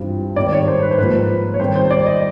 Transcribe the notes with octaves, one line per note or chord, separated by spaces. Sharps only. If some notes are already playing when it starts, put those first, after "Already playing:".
Already playing: G2 E3 G3 C4 F4
G#2 D#3 G3 C4 D5
C#5
C5
B4
C5
G#2 F3 A#3 B4
C#5
D#3 G3 C4 C5
C5
D5
D#5